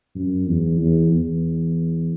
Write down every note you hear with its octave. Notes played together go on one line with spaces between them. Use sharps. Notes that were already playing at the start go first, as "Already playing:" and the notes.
F#2
E2
E2
E2